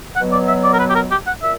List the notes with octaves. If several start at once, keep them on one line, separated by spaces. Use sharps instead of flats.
B2 F#3 B3 F#5
D5
E5
D5
A#4
B4
G4
A#4
G4
F#5
A#2 E5